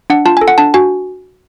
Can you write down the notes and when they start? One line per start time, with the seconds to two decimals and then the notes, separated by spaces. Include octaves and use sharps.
0.10 D4 F#5
0.26 F4 A5
0.37 G#5
0.41 A4
0.48 F#5
0.58 D4 A5
0.74 F#4 G#5